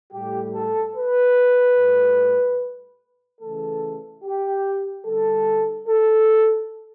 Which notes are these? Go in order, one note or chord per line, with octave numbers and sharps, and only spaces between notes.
A2 G3 G4
A4
B4
A2 G3
C#3 E3 A3 A4
G4
D3 G3 A4
A4